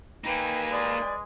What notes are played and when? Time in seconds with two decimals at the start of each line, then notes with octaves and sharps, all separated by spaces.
0.25 A#3 D#4 B4 G5 G#5
0.71 G#3 D5